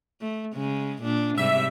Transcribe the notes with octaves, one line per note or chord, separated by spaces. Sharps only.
A3
C#3 G#3
A#2 D4
G#2 C3 G3 E5